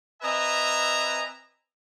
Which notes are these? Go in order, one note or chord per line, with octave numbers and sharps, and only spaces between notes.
C4 B4 D#5 E5 G#5 A#5